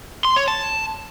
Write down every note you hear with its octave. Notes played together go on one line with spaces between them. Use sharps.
C6
C#5
A5